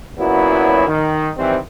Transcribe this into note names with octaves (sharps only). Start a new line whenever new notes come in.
F#2 A#2 F#3 B3 E4
D#3
D#3 E3 G3 C4